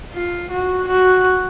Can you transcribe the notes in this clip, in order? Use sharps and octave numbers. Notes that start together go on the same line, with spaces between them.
F4
F#4
F#4